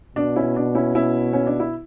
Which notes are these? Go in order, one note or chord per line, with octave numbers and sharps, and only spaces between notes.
B2 D4
C#4 E4
D4
C#4 E4
C#4 E4
C#4
D4
E4